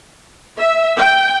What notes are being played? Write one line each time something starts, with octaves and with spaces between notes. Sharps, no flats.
E5
G5